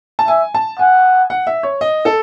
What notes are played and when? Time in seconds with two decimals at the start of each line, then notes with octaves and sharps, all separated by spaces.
0.19 A5
0.28 E5 G#5
0.54 A5
0.79 F#5 G#5
1.30 F#5
1.47 E5
1.63 C#5
1.81 D#5
2.05 A4